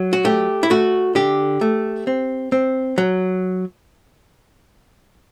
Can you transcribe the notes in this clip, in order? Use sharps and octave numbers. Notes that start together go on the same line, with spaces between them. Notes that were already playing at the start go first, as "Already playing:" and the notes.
Already playing: F#3
F#4
A3 G4
E4
A3 F#4
D3 G4
A3
C4
C4
F#3